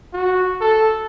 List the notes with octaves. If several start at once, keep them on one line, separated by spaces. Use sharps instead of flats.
F#4
A4